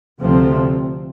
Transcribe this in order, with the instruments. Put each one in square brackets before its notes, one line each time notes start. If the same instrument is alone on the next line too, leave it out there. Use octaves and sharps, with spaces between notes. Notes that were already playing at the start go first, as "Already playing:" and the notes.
[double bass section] D2 C3 F3 A3 C4